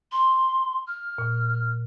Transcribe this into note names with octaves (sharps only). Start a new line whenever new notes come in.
C6
F6
A#2